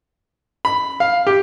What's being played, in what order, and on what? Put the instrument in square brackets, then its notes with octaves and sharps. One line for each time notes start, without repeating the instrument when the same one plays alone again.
[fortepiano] B5
F5
G4